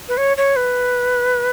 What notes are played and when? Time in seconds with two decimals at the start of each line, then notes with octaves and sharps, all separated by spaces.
0.08 B4
0.17 C#5
0.37 C#5
0.56 B4